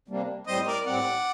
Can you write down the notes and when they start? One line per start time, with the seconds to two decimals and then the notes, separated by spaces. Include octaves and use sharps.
0.08 C3 G3 A#3 D4
0.47 A2 G3 C4 C5 D#5
0.66 A#4 D5
0.85 A2 G3 C4 D5 F#5